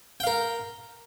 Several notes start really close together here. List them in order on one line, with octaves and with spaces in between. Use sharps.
G5 F5 A#4